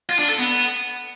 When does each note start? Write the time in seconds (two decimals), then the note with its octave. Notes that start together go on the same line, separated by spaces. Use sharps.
0.09 F4
0.19 D4
0.28 A4
0.38 B3